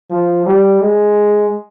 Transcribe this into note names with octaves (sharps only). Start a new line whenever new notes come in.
F3
G3
G#3